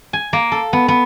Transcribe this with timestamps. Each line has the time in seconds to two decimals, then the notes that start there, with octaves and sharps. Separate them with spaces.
0.13 G#5
0.33 A#3
0.52 A4
0.73 B3
0.88 B3